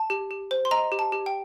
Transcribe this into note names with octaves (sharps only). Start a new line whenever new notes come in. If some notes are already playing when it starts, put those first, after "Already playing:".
Already playing: A5
G4
G4
C5
C6
D#5 A#5
G4
A5
G4
G5